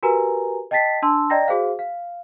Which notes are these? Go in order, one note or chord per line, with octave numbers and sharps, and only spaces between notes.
F#4 G4 A#4 B4 G#5 A#5
D#5 G5 A5 A6 B6 C7
D4 A5 C6 E6
D5 D#5 G5 A#5 A#6
F#4 G#4 C5 F5
F5